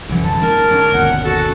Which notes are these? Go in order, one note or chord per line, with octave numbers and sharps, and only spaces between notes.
C2 F#2 D3 E3 F#3
A5
G#2 A#3 A#4
D3 C#4 D4
G1 D#2 B2 F#5
F#4 A4